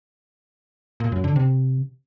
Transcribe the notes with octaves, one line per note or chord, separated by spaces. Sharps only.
A#2
F#2
D3
C3